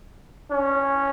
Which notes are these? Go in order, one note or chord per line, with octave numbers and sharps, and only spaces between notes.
C#4